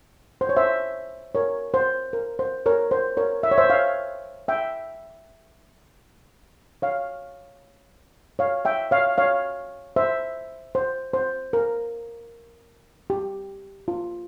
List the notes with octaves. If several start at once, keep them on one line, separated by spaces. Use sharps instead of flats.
C5
C#5
C5 E5
A#4 C#5
C5
A#4
C5
A#4 C#5
C5
A#4 C#5
E5
C#5
C5 E5
C#5 F5
E5 G5
C#5 F5
C#5 F5
E5 G5
C#5 F5
C#5 F5
C5 E5
C5
C5
A#4
G4
F4